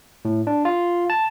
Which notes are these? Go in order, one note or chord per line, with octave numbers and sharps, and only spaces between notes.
A2
D4
F4
A5